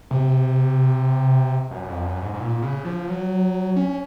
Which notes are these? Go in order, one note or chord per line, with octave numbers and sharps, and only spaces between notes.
C3
F#2
F2
F#2
G#2
G#2
A#2
C#3
F3
F#3
C#4